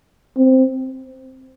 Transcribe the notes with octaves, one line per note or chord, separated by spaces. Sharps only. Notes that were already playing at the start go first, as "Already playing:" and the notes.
C4